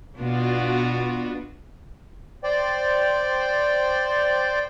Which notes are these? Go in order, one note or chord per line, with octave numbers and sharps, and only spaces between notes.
B2 B3 D4 F4 F#4
C5 D5 G5